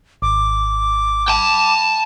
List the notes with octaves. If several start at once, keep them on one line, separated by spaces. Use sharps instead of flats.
G#1 D6
G5 A5